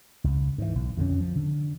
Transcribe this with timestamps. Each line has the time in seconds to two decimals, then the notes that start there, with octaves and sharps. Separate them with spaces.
0.24 C#2
0.58 G#2 E3
0.75 B1
0.97 F2 D3 C#4
1.21 F3
1.36 D3